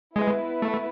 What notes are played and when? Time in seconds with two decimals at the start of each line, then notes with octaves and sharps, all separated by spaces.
0.16 G#3 B3 E4 B4
0.62 A3